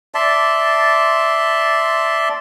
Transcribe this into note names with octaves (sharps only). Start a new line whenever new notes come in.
D5 E5 A5 C6